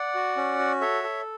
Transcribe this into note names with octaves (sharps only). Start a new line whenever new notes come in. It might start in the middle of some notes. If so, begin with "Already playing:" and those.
Already playing: D5 F#5
F#4
C#4
F#4
A4 C#5 E5
A4